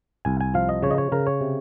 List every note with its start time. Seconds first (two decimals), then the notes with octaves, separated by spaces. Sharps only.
0.25 C2 G#5
0.41 G#5
0.54 F3 F5
0.69 D#5
0.83 C#3 C#5
0.91 D#5
0.98 C#5
1.12 C#3 A#4
1.27 C#5
1.41 C3